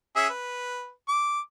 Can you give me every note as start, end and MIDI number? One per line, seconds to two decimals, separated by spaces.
0.16 0.27 61
0.16 0.27 68
0.16 0.27 76
0.29 0.90 71
1.08 1.40 86